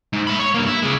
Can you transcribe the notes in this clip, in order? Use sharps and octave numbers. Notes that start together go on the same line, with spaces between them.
G#2
A3 B5
C#5
G2 A#3
E4
C#3 G#3